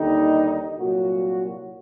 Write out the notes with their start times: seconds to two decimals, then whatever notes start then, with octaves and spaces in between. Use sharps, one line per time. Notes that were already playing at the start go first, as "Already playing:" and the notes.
Already playing: D#2 D3 G3 D#4
0.78 C2 A#2 F#3 F#4